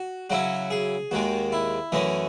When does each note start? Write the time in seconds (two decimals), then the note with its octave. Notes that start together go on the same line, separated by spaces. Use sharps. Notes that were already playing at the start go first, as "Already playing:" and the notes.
Already playing: F#4
0.30 C#3 F#3 C#4 E4 F#4
0.70 G#4
1.11 D#2 D#3 G#3 F#4
1.52 E4
1.92 F#2 E3 A3 C#4 D#5